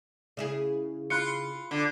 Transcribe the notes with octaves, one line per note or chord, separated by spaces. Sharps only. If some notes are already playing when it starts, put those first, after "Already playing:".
C#3 E4 G#4
F4 B5 F#6 C#7
D3